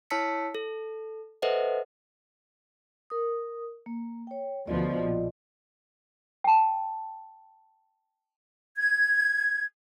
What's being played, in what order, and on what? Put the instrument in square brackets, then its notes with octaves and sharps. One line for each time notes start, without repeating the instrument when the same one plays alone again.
[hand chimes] E4 C#5 A5 E6 B6 C#7
A4
A4 B4 C5 D#5 E5 F#5
[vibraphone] A#4 D#6
A#3
C#5 G5
[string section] D2 B2 F3 [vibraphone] F4 D5 D#5
[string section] A#1
[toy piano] G5 A5
[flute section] G#6